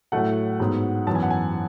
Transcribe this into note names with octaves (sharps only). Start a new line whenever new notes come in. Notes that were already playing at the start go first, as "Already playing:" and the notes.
A2 F#3 A3 F#5
G#2 F#3 B3
F#2 E3 B3 A5
G#5
F#5
G#5